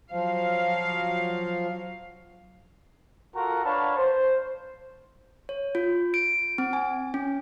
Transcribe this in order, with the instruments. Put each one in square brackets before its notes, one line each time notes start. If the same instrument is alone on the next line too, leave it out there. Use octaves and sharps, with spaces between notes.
[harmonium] F3 [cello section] F#3 F5
[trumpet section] F4 F#4 A4 A#4 F#5 A#5
D4 B4 C#5 F5 A5 B5
C5
[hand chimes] C#5
F4
D7
C4
G#5
C#4